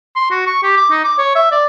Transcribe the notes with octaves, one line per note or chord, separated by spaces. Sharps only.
C6
F#4
C#6
G4
D6
D#4
D6
C#5
E5
D5